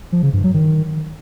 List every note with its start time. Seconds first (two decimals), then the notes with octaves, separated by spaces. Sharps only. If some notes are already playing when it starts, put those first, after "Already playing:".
0.12 F3
0.23 C#3
0.33 G2
0.44 F#3
0.54 D#3